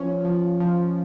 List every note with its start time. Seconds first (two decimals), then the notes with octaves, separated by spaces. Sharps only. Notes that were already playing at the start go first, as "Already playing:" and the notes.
Already playing: F3 C#4
0.25 F3
0.60 F3